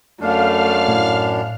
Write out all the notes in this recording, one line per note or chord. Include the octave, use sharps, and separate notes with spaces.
F#2 A3 D4 F5 F6
A2